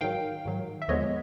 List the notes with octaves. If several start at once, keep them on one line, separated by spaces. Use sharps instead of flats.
G#2 D#3 F#3 F5 G5
G#2 D#3 F#3
E5
D#2 D3 F3 G#3 B3 C#5 D#5